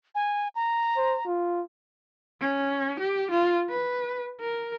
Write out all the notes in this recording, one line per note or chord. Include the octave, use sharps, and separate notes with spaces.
G#5
A#5
C5
F4
C#4
G4
F4
B4
A#4